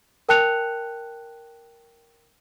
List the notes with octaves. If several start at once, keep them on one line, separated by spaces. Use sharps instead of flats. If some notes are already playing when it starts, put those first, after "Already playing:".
A#4 G5 A5 F#6 C#7 F7